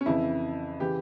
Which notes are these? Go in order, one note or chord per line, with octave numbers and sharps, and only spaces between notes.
C#4
F2 C#3 E3 E4
C#3 E3 G4